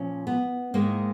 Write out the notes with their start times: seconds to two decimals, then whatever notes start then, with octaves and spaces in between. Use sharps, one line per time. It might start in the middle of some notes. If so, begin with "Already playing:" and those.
Already playing: A#2 F3 C#4
0.27 B3
0.74 G#2 D#3 G#3 A#3